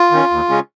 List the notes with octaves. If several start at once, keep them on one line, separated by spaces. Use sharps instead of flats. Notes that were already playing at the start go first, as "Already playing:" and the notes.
Already playing: F4
D#3 C#4
D#2
C#3 G#3 C#4